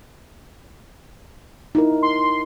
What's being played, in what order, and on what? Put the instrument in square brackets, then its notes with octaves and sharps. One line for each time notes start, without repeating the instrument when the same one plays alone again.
[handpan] D#4 E4 A#4
[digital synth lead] C6